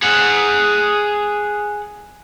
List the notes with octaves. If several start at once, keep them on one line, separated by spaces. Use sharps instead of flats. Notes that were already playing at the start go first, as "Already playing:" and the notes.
G#4 F#5